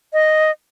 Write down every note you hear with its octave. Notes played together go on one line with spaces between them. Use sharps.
D#5